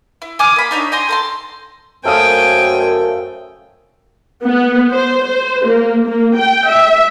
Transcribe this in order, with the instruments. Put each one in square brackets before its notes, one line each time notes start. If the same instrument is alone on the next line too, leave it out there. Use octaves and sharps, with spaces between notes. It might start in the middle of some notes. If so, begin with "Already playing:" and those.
[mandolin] E4
G#5 D6 D#6 F6
A#3 B5
D4 D#4 C#5
G5 G#5 A#5 C6
A4 A#5 C6
[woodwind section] F#2 [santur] A3 F5 D#6 [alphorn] C5 [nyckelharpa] G5 G#5
[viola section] B3
C5
C5
A#3
A#3
G5
E5